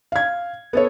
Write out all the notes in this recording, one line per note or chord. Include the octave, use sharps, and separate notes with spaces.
F5 G#6
B3 A4 C#5